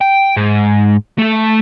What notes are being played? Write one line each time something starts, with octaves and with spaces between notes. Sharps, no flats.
G5
G#2
A3 A4